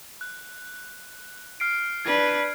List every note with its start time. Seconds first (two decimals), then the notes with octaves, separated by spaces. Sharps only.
0.21 F#6
1.60 F6 C7 D7
2.05 D4 B4 G#6